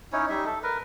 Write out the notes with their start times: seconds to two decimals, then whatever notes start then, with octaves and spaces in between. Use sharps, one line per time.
0.12 C#4 D#4 E4 C#5
0.29 G3 D#4 E5
0.46 A4
0.63 A#4 B4